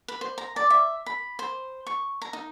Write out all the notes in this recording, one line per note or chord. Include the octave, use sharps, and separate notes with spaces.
B4
C5
A#5
D5
E5
B5
C5
C#6
A#5
D#4